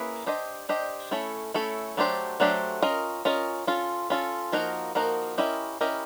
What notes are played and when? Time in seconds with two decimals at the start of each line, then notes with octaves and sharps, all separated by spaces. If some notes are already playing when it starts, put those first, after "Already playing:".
Already playing: A#3 C#4 E4 G#4 B4
0.26 D4 G4 C5 D#5
0.69 D4 G4 C5 D#5
1.11 A3 C#4 E4 A4 C#5
1.54 A3 C#4 E4 A4 C#5
1.97 F#3 A3 D4 G4 C5
2.40 F#3 A3 D4 G4 C5
2.82 C#4 F4 A#4 D#5
3.25 C#4 F4 A#4 D#5
3.67 C#4 F4 A4
4.10 C#4 F4 A4
4.52 F3 A#3 D#4 F#4 A#4
4.95 F3 A#3 D#4 F#4 A#4
5.38 C#4 E4 G4 A#4 D#5
5.81 C#4 E4 G4 A#4 D#5